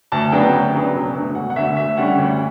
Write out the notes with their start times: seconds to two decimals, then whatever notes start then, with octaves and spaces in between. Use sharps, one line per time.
0.12 D2 A5
0.32 C#3 F#3 B3 D4 G5
0.53 D2
0.73 C#3 F#3 B3 D4
0.94 E1
1.15 D2 D3
1.35 E1 F#5
1.50 F#5
1.56 D2 D3 E5
1.76 D2 E5
1.97 D3 G3 C#4 F#5
2.18 D2